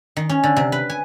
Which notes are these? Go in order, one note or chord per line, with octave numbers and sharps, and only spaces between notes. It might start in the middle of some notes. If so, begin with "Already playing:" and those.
D#3
C#4
D3
C3
B4
G#5